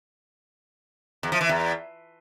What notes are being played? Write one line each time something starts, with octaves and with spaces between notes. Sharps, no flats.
E2
F3
E3
E2